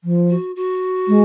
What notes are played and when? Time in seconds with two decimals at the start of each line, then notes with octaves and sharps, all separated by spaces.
0.04 F3
0.30 F#4
0.56 F#4
1.08 G#3